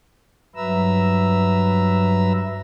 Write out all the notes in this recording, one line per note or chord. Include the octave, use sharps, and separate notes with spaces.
G2 F#3 B4 E5 A#5 E6